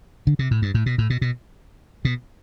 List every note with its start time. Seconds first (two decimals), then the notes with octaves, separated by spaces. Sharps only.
0.27 D3
0.39 C3
0.51 A2
0.62 G2
0.74 A2
0.86 B2
0.98 A2
1.10 B2
1.22 B2
2.05 B2